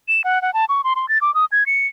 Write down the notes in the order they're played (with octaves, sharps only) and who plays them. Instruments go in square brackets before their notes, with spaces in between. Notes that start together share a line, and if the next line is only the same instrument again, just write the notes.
[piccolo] E7
F#5
F#5
A5
C#6
C6
C6
A6
D6
D#6
G#6
C#7